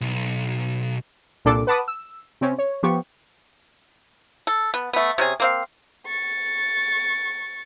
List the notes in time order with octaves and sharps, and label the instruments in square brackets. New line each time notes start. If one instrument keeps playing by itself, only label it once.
[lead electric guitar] B1
[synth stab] C2 A#2 D4 A4 D6
B4 F#5 A5 B5 D6 D#6
E6
C3 C4 C#4
C#5
F3 B3 G4 C#6
[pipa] A4
B3
A3 B3
C3 C#4 G#4
A#3 C4 F5
[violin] C#6 A6